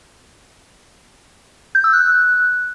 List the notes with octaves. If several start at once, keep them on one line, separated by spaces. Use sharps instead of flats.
G6
E6
F#6